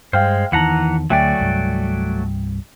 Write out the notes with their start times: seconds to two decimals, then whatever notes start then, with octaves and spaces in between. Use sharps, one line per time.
0.13 G2 G#3 C5 F5 G5 F6
0.52 E2 D#3 E3 E4 F#5 A5 A#5 F#7
1.10 D2 F#3 A3 D5 E5 G5 G#5
1.40 C2 G2